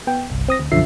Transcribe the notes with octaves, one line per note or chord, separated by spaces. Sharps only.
B3 G5
G1 C2
C4 D#6 A#6
D2
B1 F#2 D3 F3 E5 C7